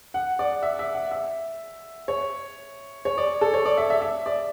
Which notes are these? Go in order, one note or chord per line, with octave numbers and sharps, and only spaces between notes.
F#5
D5
E5
E5
F#5
E5
C#5
C#5
D5
A4
C#5
D5
E5
E5
E5
D5